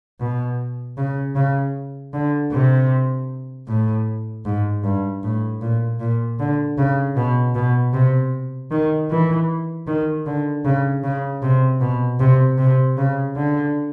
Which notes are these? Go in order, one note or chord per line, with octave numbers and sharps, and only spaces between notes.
B2
C#3
C#3
D3
C3
A2
G#2
G2
A2
A#2
A#2
D3
C#3
B2
B2
C3
D#3
E3
D#3
D3
C#3
C#3
C3
B2
C3
C3
C#3
D3